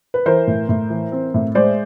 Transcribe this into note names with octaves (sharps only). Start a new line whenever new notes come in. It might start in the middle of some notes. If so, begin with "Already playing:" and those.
B4
E3 A#4 C5
A2
A2
E3
C4
A2
G#3 C5 D5